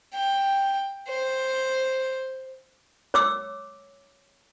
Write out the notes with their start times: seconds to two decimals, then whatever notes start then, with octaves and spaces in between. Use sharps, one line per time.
0.14 G5
1.08 C5
3.14 C#5 D6 E6